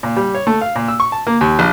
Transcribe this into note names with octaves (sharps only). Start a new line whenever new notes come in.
A#2
G3
C#5
A3
F5
A#2
E6
C#6
A5
A#3
D#2
A#1